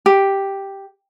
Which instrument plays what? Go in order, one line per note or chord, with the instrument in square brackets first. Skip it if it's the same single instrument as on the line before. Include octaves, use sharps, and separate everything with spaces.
[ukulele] G4